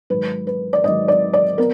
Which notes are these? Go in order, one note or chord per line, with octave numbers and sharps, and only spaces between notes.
G#2 D#3 F#3 B4
B4
D5
G#2 D#3 F#3 D#5
D5
D5
B3 A#4